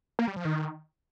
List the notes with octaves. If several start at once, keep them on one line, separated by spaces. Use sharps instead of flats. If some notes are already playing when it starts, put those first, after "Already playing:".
A#3
G3
F3
D#3